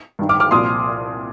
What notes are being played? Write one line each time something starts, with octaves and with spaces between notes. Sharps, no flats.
G2 D#3
D6 F6
D6 F6
C2 A#2 F3 C6 D#6